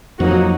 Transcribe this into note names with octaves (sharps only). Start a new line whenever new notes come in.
F2 F3 F#3 A#3 D#4 F#4